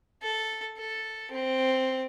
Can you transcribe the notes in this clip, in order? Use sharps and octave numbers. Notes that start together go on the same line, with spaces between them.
A4
A4
C4